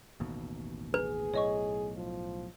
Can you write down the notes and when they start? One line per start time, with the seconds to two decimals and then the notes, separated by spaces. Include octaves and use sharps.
0.20 A1 D#2 B2
0.94 G#4 B4
1.34 B1 A2 C#5 D#5 C#6
1.96 F3